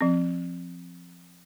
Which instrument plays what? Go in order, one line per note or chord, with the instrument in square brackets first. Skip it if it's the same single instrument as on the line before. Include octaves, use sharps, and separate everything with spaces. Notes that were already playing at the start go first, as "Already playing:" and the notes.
[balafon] F3 C4